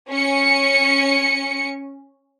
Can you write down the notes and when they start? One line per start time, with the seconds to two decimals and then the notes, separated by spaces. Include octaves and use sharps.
0.10 C#4 C#7